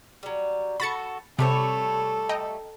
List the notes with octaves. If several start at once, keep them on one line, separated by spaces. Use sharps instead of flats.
F#3 G3
F#4 A4 B5 A6 C#7
C3 G3 A3 A4 C#5
D#5 G5 A#5